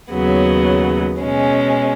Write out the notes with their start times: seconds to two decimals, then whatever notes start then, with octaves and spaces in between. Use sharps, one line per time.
0.12 D#2 C#3 F#3 B3
1.21 B2 G#3 C#4